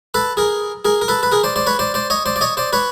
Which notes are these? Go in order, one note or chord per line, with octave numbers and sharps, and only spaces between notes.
A4 B4
G#4 A#4
G#4 A#4
A#4
A4 B4
B4
G#4 A#4
C5 D5
C5 D5
B4 C#5
C5 D5
C5 D5
C#5 D#5
C5 D5
D5
C#5 D#5
C5 D5
B4 C#5